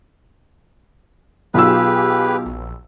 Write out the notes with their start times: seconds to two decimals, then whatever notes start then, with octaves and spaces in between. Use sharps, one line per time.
1.54 B1 F4 G4 G#4 B4 F5 E6
2.46 A#1